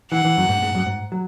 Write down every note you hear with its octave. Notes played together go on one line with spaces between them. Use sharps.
E3 F#5
E3
F#2
G#2
G#2
F#2
G#2
F#3